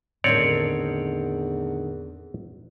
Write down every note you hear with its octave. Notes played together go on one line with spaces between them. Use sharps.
E2 A2 D3 D#3 C4 C#5 D5